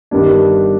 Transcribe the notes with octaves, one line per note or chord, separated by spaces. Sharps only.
G1 G2 D#3 G3 D4